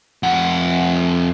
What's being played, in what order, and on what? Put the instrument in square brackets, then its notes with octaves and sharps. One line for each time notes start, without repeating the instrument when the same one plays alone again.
[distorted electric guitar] F2 F#5